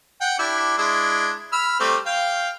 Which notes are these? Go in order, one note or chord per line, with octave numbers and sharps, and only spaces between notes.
F#5 G5
D4 E4 G4
G#3 D4 E4
B5 E6 F6
G3 A3 C4
F5 G5